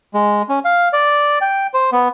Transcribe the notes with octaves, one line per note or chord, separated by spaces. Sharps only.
G#3
C#4
F5
D5
G5
C5
B3